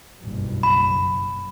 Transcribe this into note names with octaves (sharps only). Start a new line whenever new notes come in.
F#1 B1 G2
B5